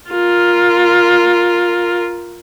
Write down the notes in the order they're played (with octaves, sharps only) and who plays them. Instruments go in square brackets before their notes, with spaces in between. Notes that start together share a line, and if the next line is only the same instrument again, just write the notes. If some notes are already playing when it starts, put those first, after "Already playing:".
[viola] F4 A#4